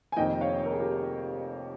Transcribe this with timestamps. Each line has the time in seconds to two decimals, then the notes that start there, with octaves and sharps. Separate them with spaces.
0.12 G#5
0.16 F1 F2 D#3 A#3 D#5 G5
0.41 C#5 F5
0.66 A#4
0.72 G#4
0.80 G4 A#4